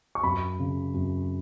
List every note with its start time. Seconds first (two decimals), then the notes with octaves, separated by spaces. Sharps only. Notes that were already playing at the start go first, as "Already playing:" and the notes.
0.15 C#6
0.23 F#2 B5
0.59 C#3
0.94 F#2